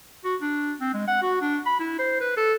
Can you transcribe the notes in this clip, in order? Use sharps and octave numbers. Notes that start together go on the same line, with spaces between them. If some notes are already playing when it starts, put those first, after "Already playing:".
F#4
D4
C4
G#3
F#5
F#4
D4
B5
E4
C5
B4
A4